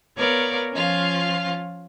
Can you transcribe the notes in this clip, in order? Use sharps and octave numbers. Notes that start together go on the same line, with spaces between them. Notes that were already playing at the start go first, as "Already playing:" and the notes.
B3 A#4 C#5 D5 F5
F3 C#4 F4 F5